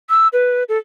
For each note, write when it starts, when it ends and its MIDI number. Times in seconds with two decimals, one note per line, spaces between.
0.09 0.28 88
0.33 0.63 71
0.69 0.78 69